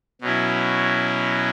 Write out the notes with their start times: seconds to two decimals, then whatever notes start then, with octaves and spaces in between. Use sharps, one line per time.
0.21 B2 F#3 C#4 E4